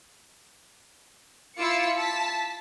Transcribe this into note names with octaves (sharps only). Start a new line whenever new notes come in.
E4 F4 D6 E6 C#7
A5 B6